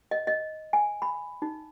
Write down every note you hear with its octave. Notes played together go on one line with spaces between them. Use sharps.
D#5
D#5
G#5
B5
D#4